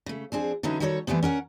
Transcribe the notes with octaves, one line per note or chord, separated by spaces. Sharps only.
C#3 A3
F3 C4 D4 G#4
D3 E3 F#3 C#4 D#4
D#3 G3 F#4 A4 B4 C#5
E3 G3 A3 B3 C4
C#4 A#4 F#5